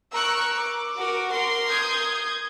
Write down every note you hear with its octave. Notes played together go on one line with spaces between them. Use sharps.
A#4 C#6 E6 F#6
D6
F#4 A#4
A#4 C6
D#6 G6 G#6